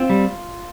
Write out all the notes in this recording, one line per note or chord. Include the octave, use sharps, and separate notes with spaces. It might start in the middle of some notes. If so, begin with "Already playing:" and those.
Already playing: C4 F4
G3